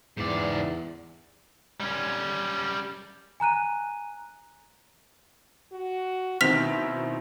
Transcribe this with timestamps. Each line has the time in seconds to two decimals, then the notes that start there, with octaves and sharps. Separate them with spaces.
0.17 E2 G#2 D5
1.80 G3 C#4
3.40 G#5 A#5 F#6 D#7
5.72 F#4
6.41 B2 D#3 C4 E4 F6 B6 F7